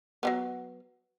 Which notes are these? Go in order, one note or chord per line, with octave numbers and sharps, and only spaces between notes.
F#3 G3 B3